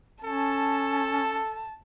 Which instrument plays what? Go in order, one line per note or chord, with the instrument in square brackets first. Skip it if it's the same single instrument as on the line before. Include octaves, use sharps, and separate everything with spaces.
[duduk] C#4 [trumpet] A4 [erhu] A5